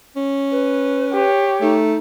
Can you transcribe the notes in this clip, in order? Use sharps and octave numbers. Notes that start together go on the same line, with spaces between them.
C#4
B4
G4 C#5
A3 D#4